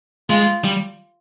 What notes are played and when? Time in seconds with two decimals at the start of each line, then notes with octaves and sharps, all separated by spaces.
0.30 G#3 F4
0.64 G3